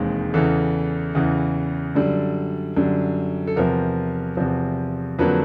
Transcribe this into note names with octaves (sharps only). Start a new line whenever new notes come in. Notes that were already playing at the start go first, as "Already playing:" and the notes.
Already playing: E1 D#2 D#3 G#3 C4
E2 C#3 E3 A4
E2 C#3 E3
F#2 D3 G3
F#2 D3 G3
A4
E2 C3 F3 A#4
E2 C3 F3
F2 D3 F#3 A#3 B4